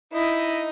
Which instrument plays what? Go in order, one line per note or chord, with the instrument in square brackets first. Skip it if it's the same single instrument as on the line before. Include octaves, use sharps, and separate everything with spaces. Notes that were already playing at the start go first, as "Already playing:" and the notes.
[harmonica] D#4 D#5 [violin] E4